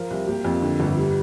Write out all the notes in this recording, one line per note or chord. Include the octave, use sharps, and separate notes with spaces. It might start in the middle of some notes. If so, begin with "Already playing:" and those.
Already playing: F3 A#4
C2
A#3 G4
F2
D3
G1
G3